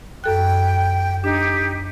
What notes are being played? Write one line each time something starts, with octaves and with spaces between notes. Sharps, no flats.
F#2 A4 G5 F#6
D4 D#4 G4